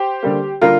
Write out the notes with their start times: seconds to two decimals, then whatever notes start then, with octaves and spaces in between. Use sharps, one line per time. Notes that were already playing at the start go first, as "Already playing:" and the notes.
Already playing: G4 C5
0.23 D3 G3 A#3
0.61 D3 G3 A#3 F4 A#4